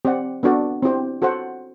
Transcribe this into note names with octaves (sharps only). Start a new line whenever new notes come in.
C4 G4 D5 F#5
B3 D4 F#4 A4 D5
C4 E4 G4 C5
F#4 A4 C5 F#5